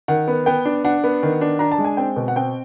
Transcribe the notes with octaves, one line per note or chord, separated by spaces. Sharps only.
D#3 F#5
B3
B3 G5
D4
D4 F#5
B3
D#3
D4
D4 A#5
A5
G#3
G#5
C4 G5
B2
F#5
C4 G5